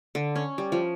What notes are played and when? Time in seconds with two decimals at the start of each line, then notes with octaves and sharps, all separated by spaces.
0.15 D3
0.36 C#4
0.58 G3
0.72 F3